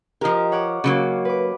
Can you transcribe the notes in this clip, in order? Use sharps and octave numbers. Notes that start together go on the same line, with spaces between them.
F3 G4 A#4 D#5
C#5 F#5 D6
C#3 F#3 A#3
B4 D6